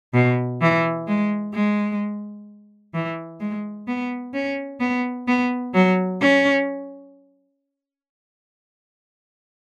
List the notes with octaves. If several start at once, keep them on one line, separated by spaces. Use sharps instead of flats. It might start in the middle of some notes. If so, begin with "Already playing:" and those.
B2
E3
G#3
G#3
E3
G#3
B3
C#4
B3
B3
F#3
C#4